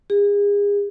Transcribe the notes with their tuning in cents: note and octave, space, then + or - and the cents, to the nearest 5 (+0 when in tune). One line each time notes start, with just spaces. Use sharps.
G#4 -35